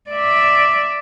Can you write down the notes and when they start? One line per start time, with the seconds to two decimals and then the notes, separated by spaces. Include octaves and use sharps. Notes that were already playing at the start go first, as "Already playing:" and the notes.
0.11 D5 E5